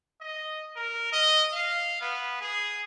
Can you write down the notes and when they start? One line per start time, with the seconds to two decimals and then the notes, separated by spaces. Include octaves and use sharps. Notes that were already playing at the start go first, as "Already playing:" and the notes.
0.21 D#5
0.76 A#4
1.12 D#5
1.52 F5
2.01 B3
2.41 G#4